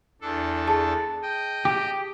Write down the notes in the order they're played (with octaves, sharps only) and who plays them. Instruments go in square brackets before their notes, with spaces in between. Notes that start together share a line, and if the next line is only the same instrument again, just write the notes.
[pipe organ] E2 D4 A4
[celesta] G#4 A5
[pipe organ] D#5 G5
[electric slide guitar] G4